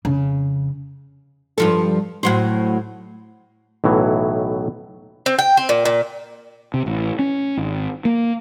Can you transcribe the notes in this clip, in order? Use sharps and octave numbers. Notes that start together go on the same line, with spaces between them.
F2 C#3
G2 F3 A4
A2 F#3 C5
B1 A2 E3 F#3
C4
G5
C4
A#2
A#2
C3
A1
C#4
G#1
A#3